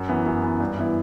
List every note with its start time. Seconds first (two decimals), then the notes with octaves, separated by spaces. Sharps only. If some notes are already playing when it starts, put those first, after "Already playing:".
Already playing: F#2
0.09 E3 B3
0.26 F#2
0.43 E3 B3
0.60 G2
0.77 E3 B3 E4